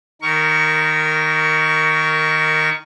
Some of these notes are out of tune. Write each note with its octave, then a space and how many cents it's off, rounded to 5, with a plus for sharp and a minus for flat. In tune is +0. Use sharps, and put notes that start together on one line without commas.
D#3 +0 A#4 -10 C#6 +15